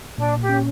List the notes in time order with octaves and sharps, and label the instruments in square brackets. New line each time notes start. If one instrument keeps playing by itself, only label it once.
[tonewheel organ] A#2 [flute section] D4
[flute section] G4
[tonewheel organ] C#4